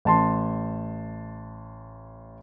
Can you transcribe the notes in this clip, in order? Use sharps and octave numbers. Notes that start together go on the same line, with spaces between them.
A1 A5 C6